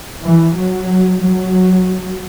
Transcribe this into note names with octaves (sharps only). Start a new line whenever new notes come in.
E3
F#3
F#3